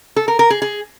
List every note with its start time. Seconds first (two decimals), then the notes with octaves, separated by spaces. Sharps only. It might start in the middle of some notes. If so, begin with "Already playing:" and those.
0.16 A4
0.28 A#4
0.39 A#4
0.50 G#4
0.62 G#4